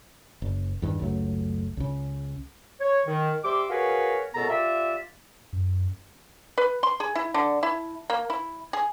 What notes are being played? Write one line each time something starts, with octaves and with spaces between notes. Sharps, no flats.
F#1
E2 G2 D#3
F#1 C#2 F#3 A3
C#2 C#3
C#5
D#3
G3 C4 E5 C6 D6
F#4 G#4 A#4 B4 C#5 F5
C#2 F#2 B2 B3 A4 A#5
F4 G4 D5 E5
F#2
B4
C6
G#4
E4
D3
E4
A#3
E4
G#4